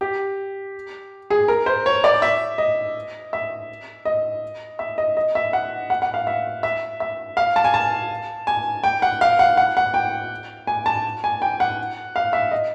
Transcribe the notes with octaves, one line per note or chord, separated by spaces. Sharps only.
G4
G#4
A#4
C5
C#5
D5
E5
D#5
E5
D#5
E5
D#5
D#5
E5
F#5
F#5
F#5
F5
E5
E5
E5
F5
A5
G#5
A5
G#5
G5
F#5
F5
F#5
F#5
F#5
G5
G#5
A5
G#5
G5
F#5
F5
E5
D#5